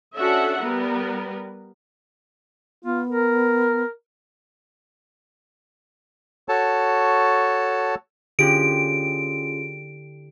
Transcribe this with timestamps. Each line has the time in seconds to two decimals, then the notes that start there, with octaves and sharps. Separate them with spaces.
0.16 C#4 D4 F#4 A4 E5 F#5
0.63 G3 B3 A#4 B4
2.84 B3 F4
3.09 A#4
6.49 F#4 A4 C#5 A5
8.39 D3 C#4 E4 F4 G4 G#4 D7